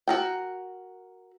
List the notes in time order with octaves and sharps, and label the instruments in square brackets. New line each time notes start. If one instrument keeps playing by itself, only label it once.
[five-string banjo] F#4 A#4 G5